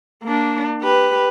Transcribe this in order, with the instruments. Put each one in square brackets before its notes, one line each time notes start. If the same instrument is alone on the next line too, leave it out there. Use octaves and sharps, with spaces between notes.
[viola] A#3 D4
G4 B4